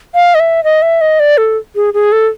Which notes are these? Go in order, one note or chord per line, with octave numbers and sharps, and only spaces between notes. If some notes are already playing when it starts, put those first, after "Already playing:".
F5
D#5
E5
D#5
E5
D#5
D5
A4
G#4
G#4
A4